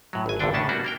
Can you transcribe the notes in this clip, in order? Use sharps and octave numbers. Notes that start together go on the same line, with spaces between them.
A2 F#3
G#1 G#5
G#1 E2 G2 D3 D4 G5
A2 C#3 C#4 D4 A5
G3 A#3 B3 D4 F#4
A#3 A#4 G5